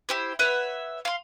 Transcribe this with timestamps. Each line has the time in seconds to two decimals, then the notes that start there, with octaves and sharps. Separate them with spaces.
0.09 E4 G4 C5
0.39 B4 C#5 E5 F#5
1.05 F5 C6